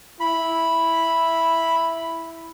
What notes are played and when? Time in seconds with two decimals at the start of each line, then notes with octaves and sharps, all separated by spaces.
0.20 E4 B5